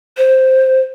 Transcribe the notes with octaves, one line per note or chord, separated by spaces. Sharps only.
C5